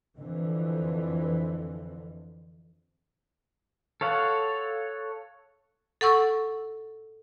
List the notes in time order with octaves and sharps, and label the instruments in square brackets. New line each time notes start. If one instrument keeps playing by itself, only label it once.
[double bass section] F2 D3 E3
[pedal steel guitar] A4 C#5 F5 F#5
[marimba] A4 F#5 C#6 E6